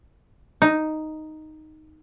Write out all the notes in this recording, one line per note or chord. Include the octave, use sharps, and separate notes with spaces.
D#4